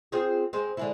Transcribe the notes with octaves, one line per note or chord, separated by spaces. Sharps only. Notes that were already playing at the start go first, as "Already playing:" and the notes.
C4 F4 G#4
G#3 C4
D3 G#3 E4